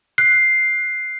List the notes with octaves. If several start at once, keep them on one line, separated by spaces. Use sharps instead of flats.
F#6 C7